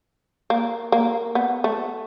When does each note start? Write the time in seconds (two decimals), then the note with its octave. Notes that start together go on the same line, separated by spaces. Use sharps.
0.50 A#3
0.92 A#3
1.35 B3
1.64 A3